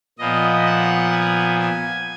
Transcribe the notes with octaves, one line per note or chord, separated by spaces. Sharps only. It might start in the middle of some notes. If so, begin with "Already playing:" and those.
A#2 F3 B3 D#5
F#5
G#5
G#5